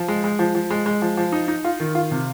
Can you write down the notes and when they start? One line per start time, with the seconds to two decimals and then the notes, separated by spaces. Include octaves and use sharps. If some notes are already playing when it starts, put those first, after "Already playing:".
Already playing: F3
0.08 G#3
0.24 G#3
0.39 F3
0.55 F3
0.70 G#3
0.86 G#3
1.02 F3
1.17 F3
1.32 D#4
1.48 D#4
1.64 F4
1.80 D#3
1.95 F4
2.11 C3